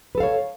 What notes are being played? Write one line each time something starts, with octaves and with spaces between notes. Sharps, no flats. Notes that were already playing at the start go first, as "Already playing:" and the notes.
A4 B4 C#5 F5